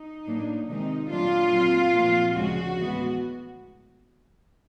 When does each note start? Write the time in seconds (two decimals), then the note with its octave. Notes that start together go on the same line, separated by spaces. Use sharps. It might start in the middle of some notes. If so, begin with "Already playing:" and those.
Already playing: D#4
0.26 A2 F#3 A#3 D4
0.68 C3 D#3 G#3 C4 D#4
1.10 A#2 F#3 A3 D4 F4
1.51 A#2 F#3 A3 C4
1.93 A#2 F3 A3 C4
2.36 D2 C#3 F3 G#3 F#4
2.78 A2 E3 G#3 B3